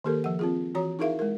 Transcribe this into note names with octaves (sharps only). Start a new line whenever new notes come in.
D#3 A#3 G4 A4 A#4
F3 F#5
C4 F4 G#4
E3 F#4 C#5 A#5
D#4 E4 G#4 A#4 E5 F5
G#3 A#4